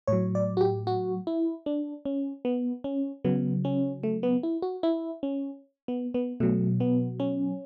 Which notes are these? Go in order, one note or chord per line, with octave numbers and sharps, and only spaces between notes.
A2 F#3 C#5
D5
F#4
G4
F#4
E4
D4
C#4
B3
C#4
C#3 F#3 B3
C#4
A3
B3
E4
F#4
E4
C#4
B3
B3
B2 F#3 A3
B3
C#4